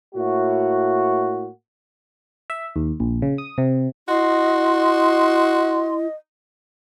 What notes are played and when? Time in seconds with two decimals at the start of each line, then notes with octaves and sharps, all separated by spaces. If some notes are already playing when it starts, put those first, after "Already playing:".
0.14 A2 A#3 F#4
2.50 E5
2.76 D#2
3.00 A#1
3.22 C#3
3.38 D#6
3.58 C3
4.08 E4 F#4 D#5 C6